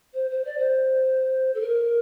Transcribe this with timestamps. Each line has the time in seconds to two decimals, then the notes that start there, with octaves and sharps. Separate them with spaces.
0.14 C5
0.30 C5
0.44 D5
0.58 C5
1.54 A4
1.61 A#4